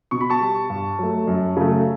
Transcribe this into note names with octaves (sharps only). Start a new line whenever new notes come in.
B2 C#6
B5
A5 C#6
G3
G2
F#3 A3
F#2
C#3 F#3 A3